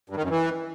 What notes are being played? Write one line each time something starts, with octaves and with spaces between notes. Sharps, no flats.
G2
D#3
F#2
E3